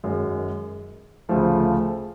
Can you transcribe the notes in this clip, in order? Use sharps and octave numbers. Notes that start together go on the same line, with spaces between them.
F#2 D#3 G#3
D2 C#3 F3 A3